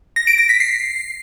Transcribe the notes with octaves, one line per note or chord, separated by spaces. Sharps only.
A#6
D7
A#6
B6
C7